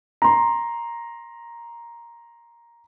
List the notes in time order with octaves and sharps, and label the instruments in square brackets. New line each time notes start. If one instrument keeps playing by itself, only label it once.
[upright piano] A#5 C6